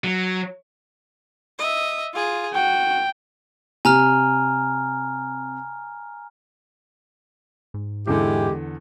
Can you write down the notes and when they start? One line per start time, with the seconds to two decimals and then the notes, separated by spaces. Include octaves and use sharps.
0.04 F#3
1.59 D#5 E5
2.14 F4 G#4
2.54 F#4 G5
3.85 C3 G#5 A#5 F6
7.74 G#2
8.07 E2 D3 G#3 E4 G4 A4